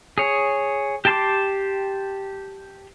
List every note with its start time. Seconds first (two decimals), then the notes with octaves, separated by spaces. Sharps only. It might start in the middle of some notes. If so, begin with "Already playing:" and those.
0.18 G#4 C#5
1.05 G4 G5 A5 C6 D6